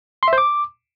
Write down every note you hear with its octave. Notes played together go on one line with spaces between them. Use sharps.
C6
E5
C5
D6